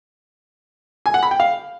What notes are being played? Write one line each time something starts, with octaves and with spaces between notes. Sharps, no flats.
G#5
F#5
B5
G5
F5